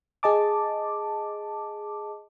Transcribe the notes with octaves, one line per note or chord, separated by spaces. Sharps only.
G#4 D#5 A5 D6